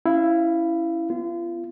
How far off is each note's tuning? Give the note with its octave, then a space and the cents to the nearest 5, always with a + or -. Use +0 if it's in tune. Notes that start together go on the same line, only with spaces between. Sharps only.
C#4 +0 E4 +0 F5 -20
B3 +10 F4 -35